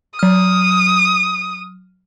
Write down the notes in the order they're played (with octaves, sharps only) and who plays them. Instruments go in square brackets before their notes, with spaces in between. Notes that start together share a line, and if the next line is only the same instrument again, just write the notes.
[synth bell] F#3 F6 [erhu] D#6